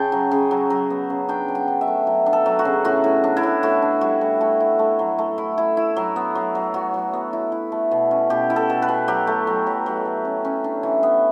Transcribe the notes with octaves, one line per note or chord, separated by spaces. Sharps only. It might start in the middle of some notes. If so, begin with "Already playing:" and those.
Already playing: C#3 G5 A5
F#3
C#3
F#3
F#3
B3
C#3
D4 G5
F#3
G5
D4
E5
A3
F#3
D4
A4
F#3
F#4
C#3
A2 F#4
A2
D4
E4
A2
A2 F#4
D4
G3 F#4
A2
A3 F#4
E4
A3
F#3
A3
E4
E4
E4
F#3
B3
F#3
F#3
F#3 F#4
F#3
B3
E4
E4
A3
B2
C#4
B2 G4
E4
A4
B2
B4
B2
F#3 G4
A3
F#3
F#3
F#3
A3
C#4
C#4
D4
E3
B3